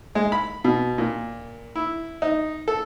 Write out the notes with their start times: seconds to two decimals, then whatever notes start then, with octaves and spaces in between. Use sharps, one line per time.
0.15 G#3
0.32 B5
0.64 B2
0.98 A#2
1.76 E4
2.22 D#4
2.68 A4